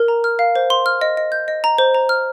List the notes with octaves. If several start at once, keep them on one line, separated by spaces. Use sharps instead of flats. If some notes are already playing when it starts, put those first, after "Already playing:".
Already playing: A#4
A#5
F6
F5
C5
C6
F6
D#5
D#5
G6
D#5
A#5
C5
A#5
F6